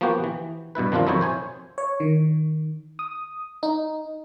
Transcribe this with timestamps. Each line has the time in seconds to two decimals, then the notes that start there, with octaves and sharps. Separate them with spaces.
0.01 F3 A#3 B3 F#4 G4
0.24 E3
0.75 G2 B2 E4 B4
0.92 D#3 F3 C4 D4 F4
1.07 F2 D#3 F#3 E4 C5 C#5
1.21 C5 C#5 G#5
1.78 C#5
2.00 D#3
2.99 D#6
3.63 D#4